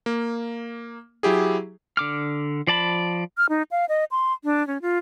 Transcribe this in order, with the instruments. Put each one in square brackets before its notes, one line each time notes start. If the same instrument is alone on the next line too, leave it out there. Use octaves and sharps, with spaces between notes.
[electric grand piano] A#3
F#3 E4 G4 G#4
[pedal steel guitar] D3 D6 F6
F3 D5 A5 B5
[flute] F6
D#4
F5
D#5
C6
D4
C#4
F4